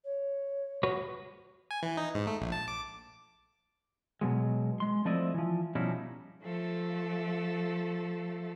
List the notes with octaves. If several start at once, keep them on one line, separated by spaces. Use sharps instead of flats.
C#5
F#4 B4 C#5
G#5
E3
D#4
G#2
A3
A#1
A5
D6
B2 F#3 G#3
G#3 C6
F3 A3 C4 E4 D5 D#5
E3 F3
B2 F3 G3 C#4 D#4 E4
F3 A3 A4